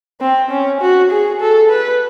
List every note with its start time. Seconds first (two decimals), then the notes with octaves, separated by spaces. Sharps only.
0.21 C4
0.51 C#4
0.81 F#4
1.11 G#4
1.41 A4
1.70 B4